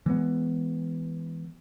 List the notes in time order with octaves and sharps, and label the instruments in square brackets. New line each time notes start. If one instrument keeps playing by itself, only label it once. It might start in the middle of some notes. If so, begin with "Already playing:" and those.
[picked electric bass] E3 G#3 B3